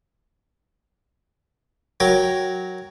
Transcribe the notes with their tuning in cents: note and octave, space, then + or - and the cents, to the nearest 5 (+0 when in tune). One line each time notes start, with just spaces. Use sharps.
F#3 +0 A#4 +0 G5 +0